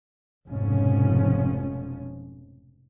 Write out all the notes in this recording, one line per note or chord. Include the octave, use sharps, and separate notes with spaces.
F1 G#2 B2 F3 C#4